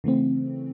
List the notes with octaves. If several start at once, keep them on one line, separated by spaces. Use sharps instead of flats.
C#3 E3 A3 C4